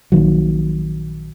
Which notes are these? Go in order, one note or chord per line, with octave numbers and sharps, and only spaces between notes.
A#1 A#2 D#3 F#3